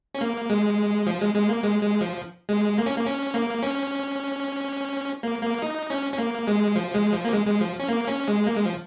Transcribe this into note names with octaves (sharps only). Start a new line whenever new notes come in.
C#4
A#3
G#3
F3
G#3
G#3
A#3
G#3
G#3
F3
G#3
A#3
C#4
A#3
C#4
A#3
C#4
A#3
A#3
D#4
C#4
C#4
A#3
G#3
F3
G#3
F3
A#3
G#3
G#3
F3
C#4
A#3
C#4
G#3
A#3
G#3
F3